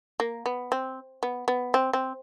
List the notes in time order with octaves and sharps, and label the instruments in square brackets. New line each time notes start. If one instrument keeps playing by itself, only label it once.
[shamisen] A#3
B3
C4
B3
B3
C4
C4